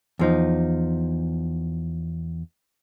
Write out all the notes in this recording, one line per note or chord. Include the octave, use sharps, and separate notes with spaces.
E2 F3 D#4